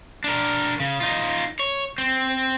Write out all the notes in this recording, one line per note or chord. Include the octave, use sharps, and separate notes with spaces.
D4 A#4
C#3
D#4 F4
C#5
C4